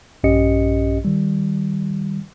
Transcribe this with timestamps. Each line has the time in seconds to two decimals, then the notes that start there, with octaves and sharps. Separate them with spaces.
0.24 A#1 G2 C#4 G4 D#5 C#7
1.05 D#3 G3